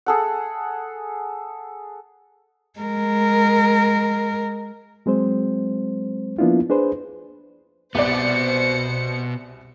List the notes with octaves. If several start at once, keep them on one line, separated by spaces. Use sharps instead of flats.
G#4 A4 F#5
G#3 A#4
F#3 G#3 C4 C5
F3 A#3 B3 D4 E4 F4
D4 G#4 B4 C5
C2 B2 B3 C5 D5 C#7